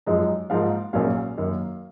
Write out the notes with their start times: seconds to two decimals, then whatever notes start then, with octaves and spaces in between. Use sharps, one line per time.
0.06 F#2 F3 G#3 D#4 D#5
0.50 G#2 F3 A#3 D#4 F5
0.93 A#1 A#2 F#3 A#3 C#4 F5
1.38 F#2 D#3 A#3